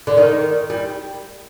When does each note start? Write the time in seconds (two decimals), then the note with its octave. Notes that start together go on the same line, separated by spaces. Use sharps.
0.07 D3
0.17 D#3
0.70 G3